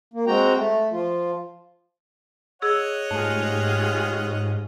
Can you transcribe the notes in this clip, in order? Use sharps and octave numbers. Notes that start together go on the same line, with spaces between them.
A#3
G#3 C4 F#4 G5 A#5
A3
F3 F4
G#4 C#5 D#5 F#5 E6
G#2 A3 F4 G4 G#4